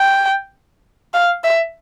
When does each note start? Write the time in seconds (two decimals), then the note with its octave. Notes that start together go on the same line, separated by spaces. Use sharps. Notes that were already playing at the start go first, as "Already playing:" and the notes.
Already playing: G5
1.14 F5
1.44 E5